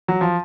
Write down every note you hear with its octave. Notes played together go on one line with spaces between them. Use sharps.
F#3
F3